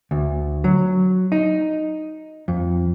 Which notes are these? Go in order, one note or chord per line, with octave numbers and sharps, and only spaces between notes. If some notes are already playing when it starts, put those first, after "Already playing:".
D2
F#3
D#4
F2